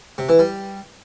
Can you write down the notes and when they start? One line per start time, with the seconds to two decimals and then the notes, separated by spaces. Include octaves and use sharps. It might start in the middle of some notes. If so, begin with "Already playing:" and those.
0.18 C3
0.29 E3
0.39 G3